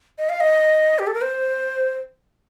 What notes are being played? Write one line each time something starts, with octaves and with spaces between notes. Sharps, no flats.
D#5
F5
D#5
G4
A4
A#4
C5